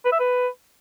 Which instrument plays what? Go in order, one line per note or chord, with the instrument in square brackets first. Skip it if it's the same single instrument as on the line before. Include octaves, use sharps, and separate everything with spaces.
[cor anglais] B4
E5
B4